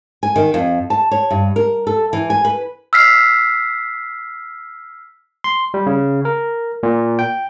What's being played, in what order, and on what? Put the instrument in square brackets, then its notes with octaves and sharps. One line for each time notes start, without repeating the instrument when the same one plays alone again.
[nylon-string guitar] G#5
D#3
F2
A5
C#5
G2
A#4
A4
E3
G#5
B4
[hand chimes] E6 F6 B6 C7
[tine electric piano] C6
G3
C#3
A#4
A#2
G5